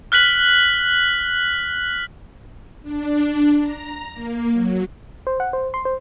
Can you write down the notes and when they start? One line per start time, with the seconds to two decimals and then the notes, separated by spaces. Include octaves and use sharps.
0.12 F6 F#6 B6 F#7
2.82 D4
3.60 A#5
4.13 A#3
4.52 F#3
5.27 C5
5.40 F#5
5.53 C5
5.74 C6
5.85 C5